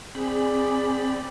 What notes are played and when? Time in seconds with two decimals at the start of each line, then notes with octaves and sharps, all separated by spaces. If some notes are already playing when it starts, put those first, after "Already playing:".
0.15 C4 G#4 D5 B5